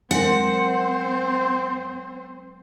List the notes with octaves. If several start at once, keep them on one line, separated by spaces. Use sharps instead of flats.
F#3 G#3 C4 A#4 C5 F#5